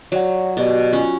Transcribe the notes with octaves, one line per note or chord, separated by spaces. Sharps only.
F#3 C#5 D5 F#5
B2 F#4 G4 D5
C#4 F4